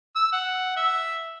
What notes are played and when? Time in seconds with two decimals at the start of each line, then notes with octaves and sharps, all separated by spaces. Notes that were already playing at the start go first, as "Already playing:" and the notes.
0.15 E6
0.32 F#5
0.76 E5